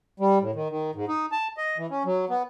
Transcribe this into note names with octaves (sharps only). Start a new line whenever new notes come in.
G3
A2
D#3
D#3
G#2
D#4
A5
D#5
E3
C#4
F#3
B3